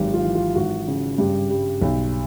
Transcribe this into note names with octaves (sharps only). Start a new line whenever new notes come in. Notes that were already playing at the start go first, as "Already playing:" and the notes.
Already playing: G#1 F#3 G4
F4
E3
F4
G#1 F#4
C#3
G2 G4
G3
B1